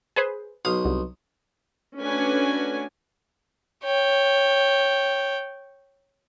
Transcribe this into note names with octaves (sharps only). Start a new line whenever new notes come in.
G#4 B4 C5
B1 F5 D#6
C2
A3 C#4 D4 F#4 B4 G#5
C#5 G5